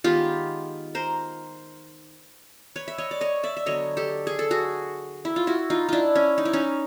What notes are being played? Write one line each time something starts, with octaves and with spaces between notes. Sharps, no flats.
D#3 G#3 B3 F4 G4
A#4 C5
B4 C#5
E5
C#5 D#5
D5
C#5 D#5
D5 E5
E5
D3 F#3 B3 C#5 D#5
G4 A4
G#4
A4
F#4 G#4
E4
F4
E4 F#4
D#4 F4
D4 E4 F4
C#4
D#4
E4
C#4 D#4